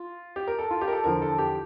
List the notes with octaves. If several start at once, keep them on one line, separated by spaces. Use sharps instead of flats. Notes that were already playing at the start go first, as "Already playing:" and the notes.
Already playing: F4
G4
A#4
A4
F4
G4
A#4
A4
E2 D3 F3 A#4
A4
G4